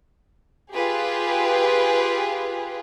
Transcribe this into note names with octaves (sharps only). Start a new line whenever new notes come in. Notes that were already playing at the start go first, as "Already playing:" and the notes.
F4 G4 G#4 B4